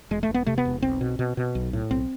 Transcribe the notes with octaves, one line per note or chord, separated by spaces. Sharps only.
E1 G#3
A3
E1
B3
C3 A3
B3
E1
B1 C4
B2
B2
B2
B1
A2
B1 C4